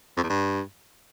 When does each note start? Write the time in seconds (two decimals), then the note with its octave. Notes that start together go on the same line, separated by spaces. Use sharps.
0.17 F2
0.23 E2
0.30 G2